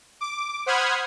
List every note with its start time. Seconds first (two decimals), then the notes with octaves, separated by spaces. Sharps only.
0.21 D6
0.66 C5 F#5 B5 D#6 F6 G#6